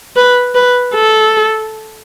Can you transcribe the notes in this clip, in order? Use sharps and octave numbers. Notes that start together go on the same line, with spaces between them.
B4
B4
A4